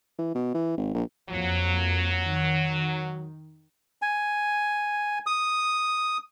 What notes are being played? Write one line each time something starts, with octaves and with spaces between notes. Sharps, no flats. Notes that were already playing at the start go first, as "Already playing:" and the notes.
E3
B2
E3
G#1
A#1
F2 F#3 A#3
D#3
G#5
D#6